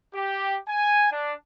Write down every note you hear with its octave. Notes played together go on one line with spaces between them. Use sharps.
G4
G#5
D4